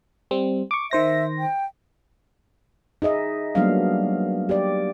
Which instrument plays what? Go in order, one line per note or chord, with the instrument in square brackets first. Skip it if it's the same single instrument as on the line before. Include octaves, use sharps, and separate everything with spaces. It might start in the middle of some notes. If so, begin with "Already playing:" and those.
[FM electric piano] G3 C4
C#6 D6
[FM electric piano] D#3 C5 A#6 [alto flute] E5
[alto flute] G5
[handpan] D#4 G#4 D#5 E5
F#3 G3 A#3 B3 D4 F5
G4 D5